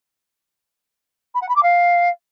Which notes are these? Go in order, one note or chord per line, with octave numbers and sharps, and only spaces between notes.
B5
F#5
B5
D6
F5